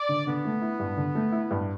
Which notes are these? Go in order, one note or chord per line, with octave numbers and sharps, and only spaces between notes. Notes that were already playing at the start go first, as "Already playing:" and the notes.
Already playing: D5
D3
D3 B3
A3
E4
G2
D3
A3
E4
G2